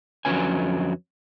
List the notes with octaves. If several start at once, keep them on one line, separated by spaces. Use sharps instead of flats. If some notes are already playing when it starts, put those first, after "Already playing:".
F2 D3 F#3 C#4 B4 G#5